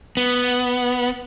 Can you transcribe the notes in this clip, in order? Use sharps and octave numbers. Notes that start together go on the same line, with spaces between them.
B3